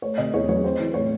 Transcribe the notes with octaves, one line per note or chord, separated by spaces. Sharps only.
A3 C#5
C3 D#5
E2 C#5
F#3 C#5
C4 C5
E3
A2 C#5